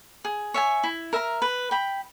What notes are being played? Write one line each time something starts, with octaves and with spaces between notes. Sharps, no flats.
G#4
C#5 E5 G#5
E4
A#4 E5 A#5
B4
G5 B5